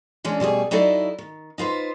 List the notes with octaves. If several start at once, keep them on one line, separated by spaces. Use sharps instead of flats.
E3 G#3 C#4 D4
B2 G3 A3 G#4
F#3 D#4 E4 A4 D5 D#5
D#3
D#4 F4 B4 C5